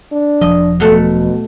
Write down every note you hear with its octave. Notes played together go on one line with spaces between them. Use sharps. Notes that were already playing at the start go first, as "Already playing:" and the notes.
D4
E1 F3 D#5
B2 F#3 A3 F#5